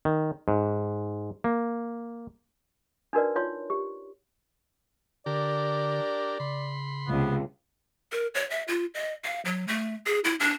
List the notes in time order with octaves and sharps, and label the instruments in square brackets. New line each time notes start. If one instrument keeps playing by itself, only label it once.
[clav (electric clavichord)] D#3
G#2
A#3
[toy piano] D4 D#4 F#4 A#4 B4 D5
D#4 F4 C#5 C6
G4
[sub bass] D3 [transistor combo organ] D4 G4 A#4 [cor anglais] D5
[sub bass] C#3 [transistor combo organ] B5 C6
[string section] C#2 C3 [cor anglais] B3
[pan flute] A#4
C#5
E5
F4
D#5
F5
F#3
A3
G#4
E4
D4